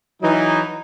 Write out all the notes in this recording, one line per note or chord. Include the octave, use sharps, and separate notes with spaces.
E3 F#3 D#4